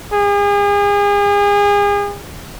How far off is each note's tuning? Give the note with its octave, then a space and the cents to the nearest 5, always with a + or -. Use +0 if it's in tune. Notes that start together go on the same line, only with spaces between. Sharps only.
G#4 -35